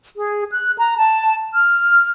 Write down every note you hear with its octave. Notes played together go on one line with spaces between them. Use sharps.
G#4
F#6
A#5
A5
F6